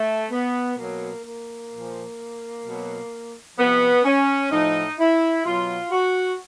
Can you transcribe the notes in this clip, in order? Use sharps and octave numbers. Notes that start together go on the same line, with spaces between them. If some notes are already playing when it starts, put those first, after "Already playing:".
Already playing: A3
B3
B2 F#3 A#3
A#3
A#2 F3
B2 F#3
C3 F3 B3
C#4
A2 F3 D#4
E4
B2 F#3 F4
F#4